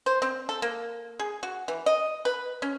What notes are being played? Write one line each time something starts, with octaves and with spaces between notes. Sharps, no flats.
C5
C4
A4
A#3
G#4
F#4
E3
D#5
B4
C#4